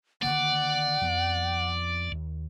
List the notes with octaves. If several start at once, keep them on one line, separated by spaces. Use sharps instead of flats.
D3 D#3 A#3 D5 F#5
F2 F3 B3
D#2